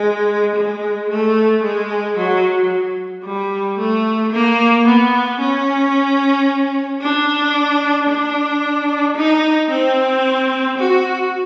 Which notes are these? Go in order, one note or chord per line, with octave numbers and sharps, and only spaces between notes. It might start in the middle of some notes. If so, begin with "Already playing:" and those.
Already playing: G#3
G#3
A3
G#3
F#3
G3
A3
A#3
B3
C#4
D4
D4
D#4
C4
F#4